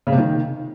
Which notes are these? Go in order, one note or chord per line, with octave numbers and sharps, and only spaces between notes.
C#3
C3
D#3